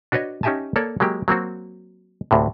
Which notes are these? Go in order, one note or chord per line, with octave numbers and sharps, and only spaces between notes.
D4 F#4 B4 C#5 D#5
C#4 D#4 G4 E5 G#5 A5
A#3 A4 C#5 D5
F#3 G#3 A#3 G4
F#3 A#3 C4 F#4
D2 A2 C3